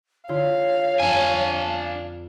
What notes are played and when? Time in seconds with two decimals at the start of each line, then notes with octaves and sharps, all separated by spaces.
0.29 D3 E4 F4 C#5 F5
1.00 F2 D4 G#5